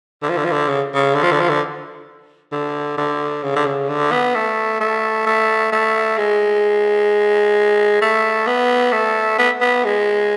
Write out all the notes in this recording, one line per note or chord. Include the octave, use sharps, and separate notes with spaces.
D3
F3
D3
F3
D3
C#3
C#3
D3
F3
D3
F3
D3
D3
D3
C#3
D3
C#3
D3
B3
A3
A3
A3
A3
G#3
A3
B3
A3
B3
B3
G#3